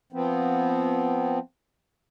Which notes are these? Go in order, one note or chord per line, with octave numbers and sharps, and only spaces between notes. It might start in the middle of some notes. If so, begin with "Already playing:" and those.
F3 B3 C4